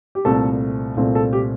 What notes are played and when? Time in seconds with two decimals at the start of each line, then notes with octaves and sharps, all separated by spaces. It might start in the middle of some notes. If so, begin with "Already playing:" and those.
0.15 G4
0.25 C2 A#2 A3 C4 A4
0.96 C2 A#2 A3 C4
1.15 A4
1.33 G4